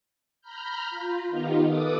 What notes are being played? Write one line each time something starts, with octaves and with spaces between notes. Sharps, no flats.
A#5 B5 F6 G6
F4
D#3 B3 D#4 F4 G4
A4 B4 D6 D#6